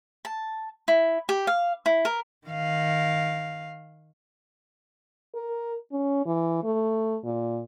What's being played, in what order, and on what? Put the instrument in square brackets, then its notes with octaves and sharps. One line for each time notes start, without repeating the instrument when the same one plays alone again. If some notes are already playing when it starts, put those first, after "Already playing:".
[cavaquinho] A5
E4
G4
F5
E4
A#4
[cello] D#3 F5
[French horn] A#4
C#4
E3
A3
A#2